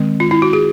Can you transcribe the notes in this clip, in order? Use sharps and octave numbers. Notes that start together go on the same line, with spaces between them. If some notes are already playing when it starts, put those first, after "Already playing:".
Already playing: D#3 G#3 C4
F4
E4
F#4
G#4